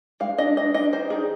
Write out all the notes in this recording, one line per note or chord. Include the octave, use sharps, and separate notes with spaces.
G#3 F5
D4 D#5
D4 D#5
D4 D#5
D#3 C5
D#3 G#4